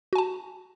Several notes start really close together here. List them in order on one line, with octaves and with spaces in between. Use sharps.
F#4 G#5 A5